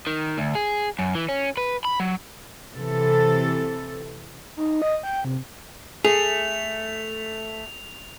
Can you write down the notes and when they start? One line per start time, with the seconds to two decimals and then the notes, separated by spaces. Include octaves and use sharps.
0.07 D#3
0.38 D2
0.55 G#4
0.99 F#2
1.15 E3
1.29 C#4
1.57 B4
1.85 B5
2.00 F#3
2.74 C3 E3 A4
4.57 D#4
4.82 D#5
5.03 G5
5.24 C3
6.05 A3 G#4 F7